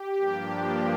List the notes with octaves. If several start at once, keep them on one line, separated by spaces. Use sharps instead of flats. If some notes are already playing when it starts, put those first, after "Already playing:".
Already playing: G4
G2 F3 A#3 D4